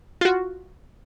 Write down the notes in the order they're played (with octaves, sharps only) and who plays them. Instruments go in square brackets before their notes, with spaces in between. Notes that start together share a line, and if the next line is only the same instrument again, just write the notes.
[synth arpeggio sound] F4 F#4